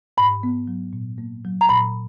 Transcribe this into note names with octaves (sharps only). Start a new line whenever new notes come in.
G#2 B5
B3
F#3
A#2
A#3
F#3
A#5
A#2 B5